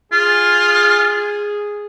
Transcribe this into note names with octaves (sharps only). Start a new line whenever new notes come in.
F4 G#4